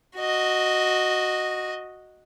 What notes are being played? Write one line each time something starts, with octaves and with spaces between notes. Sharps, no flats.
F#4 D#5